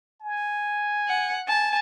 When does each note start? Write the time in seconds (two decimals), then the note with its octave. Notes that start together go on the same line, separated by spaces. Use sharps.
0.21 G#5
1.08 F#5
1.48 G#5 A5